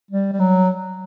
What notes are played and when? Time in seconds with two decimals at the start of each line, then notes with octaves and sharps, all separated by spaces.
0.11 G3
0.32 G3
0.40 F#3